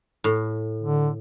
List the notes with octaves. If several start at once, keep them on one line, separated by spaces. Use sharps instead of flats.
A2
D3